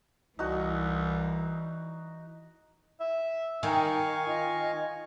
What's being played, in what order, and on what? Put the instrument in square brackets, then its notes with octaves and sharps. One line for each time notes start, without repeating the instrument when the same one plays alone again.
[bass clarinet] C2 [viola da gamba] E3 [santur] D#4 F#4
[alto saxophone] E5
[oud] D#3 [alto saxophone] D#4 [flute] A#4 [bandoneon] F5 G#5 C#6
[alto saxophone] F4 [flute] D#5